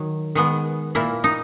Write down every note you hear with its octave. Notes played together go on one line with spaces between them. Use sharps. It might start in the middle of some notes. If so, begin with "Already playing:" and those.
Already playing: D#3 F#3
D#3 G#3 B3
A#2 A#3 E4
D#4